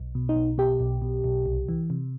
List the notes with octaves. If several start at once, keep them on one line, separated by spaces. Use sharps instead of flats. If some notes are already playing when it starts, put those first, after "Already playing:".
Already playing: B1
B2
D#4
B1
B2 G4
B1
B2
B1
C2
E3
C3